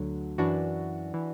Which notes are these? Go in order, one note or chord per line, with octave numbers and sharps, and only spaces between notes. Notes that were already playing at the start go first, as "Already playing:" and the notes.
Already playing: D2 D3 F#3
F#2 E3 D4 F#4
E3